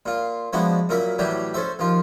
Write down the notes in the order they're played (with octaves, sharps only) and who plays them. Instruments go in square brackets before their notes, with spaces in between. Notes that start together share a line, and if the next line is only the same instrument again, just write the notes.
[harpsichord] A#2 F4
F3 G#3 B3 D4 E4 F#4
F#2 A#2 A#4 E5 B5
A2 E3 F#3 G3 G4
C#4 A4 C5 E5
D#2 F3 F4